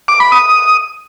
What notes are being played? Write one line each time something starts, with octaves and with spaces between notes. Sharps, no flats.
D6
B5
D#6